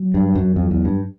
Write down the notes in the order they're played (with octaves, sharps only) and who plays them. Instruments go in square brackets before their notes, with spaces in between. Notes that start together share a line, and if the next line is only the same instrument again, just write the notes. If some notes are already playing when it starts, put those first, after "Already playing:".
Already playing: [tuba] F#3
[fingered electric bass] G2
F#2
F2
E2
G2